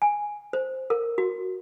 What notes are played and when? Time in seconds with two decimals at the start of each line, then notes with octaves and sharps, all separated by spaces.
0.02 G#5
0.53 C5
0.90 A#4
1.18 F#4